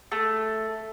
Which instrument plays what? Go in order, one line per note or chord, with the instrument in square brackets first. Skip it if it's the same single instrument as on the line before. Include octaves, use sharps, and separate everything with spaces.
[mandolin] A3